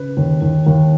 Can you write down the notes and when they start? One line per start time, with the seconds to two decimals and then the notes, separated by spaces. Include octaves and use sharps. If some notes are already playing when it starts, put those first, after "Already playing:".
Already playing: C#3 B4
0.17 D#2
0.42 D#2
0.67 D#2